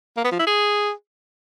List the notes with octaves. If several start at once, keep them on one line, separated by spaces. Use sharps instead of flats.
A#3
B3
F3
E4
G#4